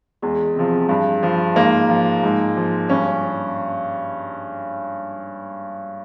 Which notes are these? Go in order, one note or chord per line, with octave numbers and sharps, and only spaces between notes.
E2 G#3
C3 F3
G2
F3
G#2 A#3
F3
G#2
F3
G2 C#4